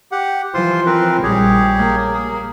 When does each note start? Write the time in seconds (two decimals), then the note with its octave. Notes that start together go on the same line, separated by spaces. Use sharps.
0.12 G4 F#5
0.54 E3 F3 F4 C5 C6
0.86 C4 A#4 B4
1.23 A#1 G3 G4 G#4 C#5
1.78 A#3
2.14 G#4